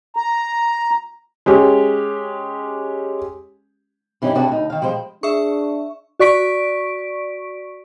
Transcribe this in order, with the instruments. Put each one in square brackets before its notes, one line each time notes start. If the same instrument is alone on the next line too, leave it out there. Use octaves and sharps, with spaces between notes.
[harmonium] A#5
[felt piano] G#3 C#4 G4
[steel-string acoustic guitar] G2 E3 C#4 D#4 G4
C3 D4 F#4 G#4 B4 A5
D2 D#4
D#3 F5
F3 G3 G#3 C5
[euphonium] D4 [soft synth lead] G#4 [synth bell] E5 C#6
[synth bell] F#4 D5 C#6 B6 D7